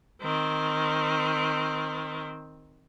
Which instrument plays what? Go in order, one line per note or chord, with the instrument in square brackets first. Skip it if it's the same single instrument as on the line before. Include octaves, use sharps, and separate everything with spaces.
[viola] D#3 C4